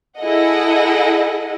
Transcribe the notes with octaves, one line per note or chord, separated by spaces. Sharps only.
E4 G#4 A4 D#5 F#5